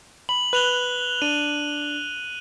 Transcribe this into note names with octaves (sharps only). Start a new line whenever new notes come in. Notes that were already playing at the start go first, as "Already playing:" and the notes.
B5 F#7
B4 F#6 F7 G7
D4 D#7